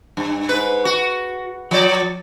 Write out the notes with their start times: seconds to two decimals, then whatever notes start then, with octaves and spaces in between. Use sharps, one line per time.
0.17 G2
0.49 G#2 B4
0.85 F#4
1.71 F3 D5